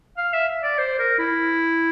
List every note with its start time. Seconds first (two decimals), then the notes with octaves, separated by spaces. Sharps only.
0.17 F5
0.33 E5
0.63 D5
0.78 C5
0.99 A#4
1.18 E4